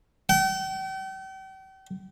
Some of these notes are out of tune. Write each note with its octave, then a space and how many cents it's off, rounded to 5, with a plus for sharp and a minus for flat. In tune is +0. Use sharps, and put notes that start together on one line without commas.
G5 -40